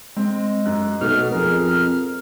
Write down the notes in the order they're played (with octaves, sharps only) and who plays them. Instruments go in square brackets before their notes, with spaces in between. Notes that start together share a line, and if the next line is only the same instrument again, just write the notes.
[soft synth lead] G#3 [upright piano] C4
[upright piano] F#2 F#6
[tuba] B1 [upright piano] B2 A3 [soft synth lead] F6
[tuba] F2 [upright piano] G#4 A#4